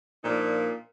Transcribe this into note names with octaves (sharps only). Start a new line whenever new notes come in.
A#2 F3 A#3 D4 D#4